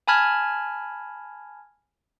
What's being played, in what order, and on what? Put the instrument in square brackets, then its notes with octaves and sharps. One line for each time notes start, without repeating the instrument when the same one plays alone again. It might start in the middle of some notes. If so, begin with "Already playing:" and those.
[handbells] G#5 A5 B5 F6 G#6